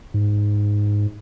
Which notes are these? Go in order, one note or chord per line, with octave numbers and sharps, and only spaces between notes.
G#2